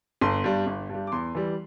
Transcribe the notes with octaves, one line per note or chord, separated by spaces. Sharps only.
G1 C6
G2 G3
G1
G2 G3
D6
E2 C6
E3 G3